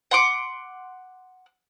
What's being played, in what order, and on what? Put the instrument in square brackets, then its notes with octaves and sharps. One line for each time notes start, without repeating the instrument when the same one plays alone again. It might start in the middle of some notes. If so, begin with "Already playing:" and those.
[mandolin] F#5 C6 D6